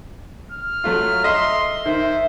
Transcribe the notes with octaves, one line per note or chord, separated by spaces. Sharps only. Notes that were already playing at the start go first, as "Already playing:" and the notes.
F6
F#3 A3 F4
D#5 E5 C6
D#3 C5 E5